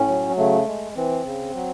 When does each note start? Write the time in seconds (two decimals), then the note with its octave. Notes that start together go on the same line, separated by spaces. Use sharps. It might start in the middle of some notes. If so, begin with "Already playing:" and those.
Already playing: A2 C#4
0.08 F#3
0.38 C#3 A3
0.67 G#3
0.96 E3 C4
1.24 C#3
1.55 F#3